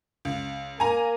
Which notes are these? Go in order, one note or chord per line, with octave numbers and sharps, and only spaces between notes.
C#2
A#3 G#5 A#5